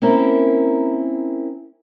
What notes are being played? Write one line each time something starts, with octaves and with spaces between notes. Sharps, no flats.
A#3 C4 C#4 E4 A#4